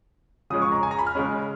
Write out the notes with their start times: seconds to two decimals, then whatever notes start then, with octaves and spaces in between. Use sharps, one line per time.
0.50 C#3 F3 G#3 C#4 D#6
0.62 C#6
0.72 A#5
0.83 G#5
0.91 A#5
0.99 B5
1.07 F6
1.15 C#3 G#3 C#4